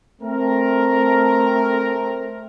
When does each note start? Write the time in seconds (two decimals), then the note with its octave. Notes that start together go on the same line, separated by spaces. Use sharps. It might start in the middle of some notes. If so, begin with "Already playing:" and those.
0.22 A3 C4 A#4